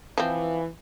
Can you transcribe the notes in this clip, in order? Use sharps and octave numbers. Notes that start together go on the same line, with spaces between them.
E3 F3 C4